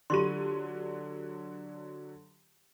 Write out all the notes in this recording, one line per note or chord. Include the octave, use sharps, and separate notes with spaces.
D3 F#3 F4 G4 C6 D#7